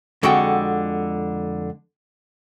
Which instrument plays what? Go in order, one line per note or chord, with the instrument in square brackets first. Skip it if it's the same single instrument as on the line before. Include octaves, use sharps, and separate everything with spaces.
[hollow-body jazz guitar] F2 D3 G#3 F#4 F#5 G5